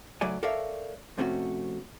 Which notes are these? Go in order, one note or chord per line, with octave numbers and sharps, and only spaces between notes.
C#2 G#2 F#3 A3 D5 G#5
A4 A#4 C#5 D5 E5 F5
F2 C3 A3 C#4 F#4